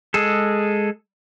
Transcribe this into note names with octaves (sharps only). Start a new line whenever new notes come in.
G#3 G#4 A4